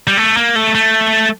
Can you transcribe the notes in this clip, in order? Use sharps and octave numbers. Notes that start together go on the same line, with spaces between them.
G3
A3
A#3
A3
A3